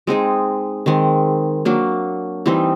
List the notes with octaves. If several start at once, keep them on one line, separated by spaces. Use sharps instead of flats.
G#3 C4 D#4 G#4
D#3 G#3 C4
F#3 A#3 D4
E3 G3 C4 D#4